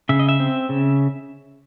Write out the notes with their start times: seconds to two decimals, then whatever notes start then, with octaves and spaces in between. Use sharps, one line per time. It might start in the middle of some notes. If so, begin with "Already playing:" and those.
0.09 C#3 E5
0.19 D#5
0.29 E5
0.40 C4
0.69 C#3